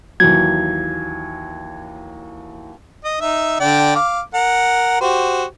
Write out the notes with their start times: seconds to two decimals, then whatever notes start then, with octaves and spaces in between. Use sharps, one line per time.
0.20 D#2 E3 F#3 G#6
3.05 D#5
3.21 D#4 E5
3.60 D3 D5 G5
3.95 F5 D6
4.34 A#4 F#5
5.01 F#4 G4 C5